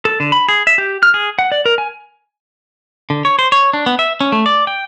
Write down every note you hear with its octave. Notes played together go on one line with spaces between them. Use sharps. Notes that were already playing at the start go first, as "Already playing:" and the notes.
A4
D3
B5
G#4
E5
G4
F6
G#4
F#5
D5
A#4
G#5
D3
C#5
C5
C#5
D4
B3
E5
C#4
A3
D5
G5